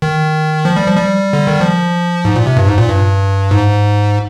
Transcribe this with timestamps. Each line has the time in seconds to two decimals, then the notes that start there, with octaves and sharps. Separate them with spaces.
0.02 D#3
0.65 F3
0.76 G3
0.87 F3
0.97 G3
1.33 D3
1.47 D#3
1.61 F3
2.25 G#2
2.35 A#2
2.46 C3
2.57 G2
2.67 G#2
2.78 A#2
2.88 G2
3.51 G#2